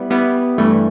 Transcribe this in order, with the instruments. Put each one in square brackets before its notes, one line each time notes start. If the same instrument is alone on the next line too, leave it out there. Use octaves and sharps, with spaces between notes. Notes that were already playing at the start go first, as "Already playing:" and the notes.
Already playing: [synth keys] G3 B3 E4
G3 B3 E4
G2 E3 A3